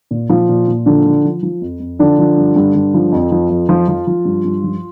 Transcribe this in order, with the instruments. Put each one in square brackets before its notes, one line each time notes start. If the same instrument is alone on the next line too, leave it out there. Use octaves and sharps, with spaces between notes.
[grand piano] A#2
A#2 F3 F4
A#2
A#2
D3 F3 D4
F3
F3
F3
F2
F2
D3 F3 D4
F3
G2
G2
G2
F3
F2
F3
F2
F3 F4
F3
F3
G2
G2
F3